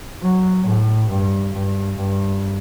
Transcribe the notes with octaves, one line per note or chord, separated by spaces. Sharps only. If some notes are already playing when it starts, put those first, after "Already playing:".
F#3
A2
G2
G2
G2